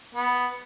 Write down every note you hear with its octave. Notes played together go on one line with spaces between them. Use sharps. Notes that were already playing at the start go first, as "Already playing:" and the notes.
B3